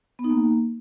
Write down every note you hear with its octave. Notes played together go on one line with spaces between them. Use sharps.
B3
D#4
A#3